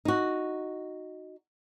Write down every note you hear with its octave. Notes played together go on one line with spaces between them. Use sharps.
D#4 F#4